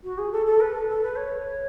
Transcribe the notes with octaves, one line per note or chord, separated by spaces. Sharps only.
F#4
G#4
A4
A4
B4
A4
A4
B4
C#5